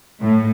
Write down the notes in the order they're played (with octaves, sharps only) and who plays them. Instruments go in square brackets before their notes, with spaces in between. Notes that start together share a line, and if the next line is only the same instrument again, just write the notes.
[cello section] A2